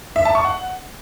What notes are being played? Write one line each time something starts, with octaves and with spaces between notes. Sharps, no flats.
E5
A5
C#6
F#5